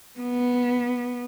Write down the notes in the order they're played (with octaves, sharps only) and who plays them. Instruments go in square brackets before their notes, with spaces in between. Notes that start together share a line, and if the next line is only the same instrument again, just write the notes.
[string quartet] B3